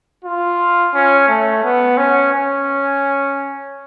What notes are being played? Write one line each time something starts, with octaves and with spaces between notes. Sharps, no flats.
F4
C#4
A3
B3
C#4
C#4